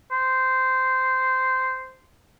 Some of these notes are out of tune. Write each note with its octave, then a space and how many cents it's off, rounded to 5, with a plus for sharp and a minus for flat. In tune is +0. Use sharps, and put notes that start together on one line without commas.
C5 -10